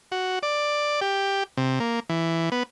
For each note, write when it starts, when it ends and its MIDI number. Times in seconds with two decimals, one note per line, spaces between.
0.12 0.39 66
0.43 1.00 74
1.01 1.43 67
1.57 1.79 48
1.80 2.00 58
2.09 2.50 52
2.52 2.63 59